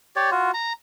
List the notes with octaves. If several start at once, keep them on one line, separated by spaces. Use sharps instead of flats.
G4 C#5 D5
F4 F#4
A#5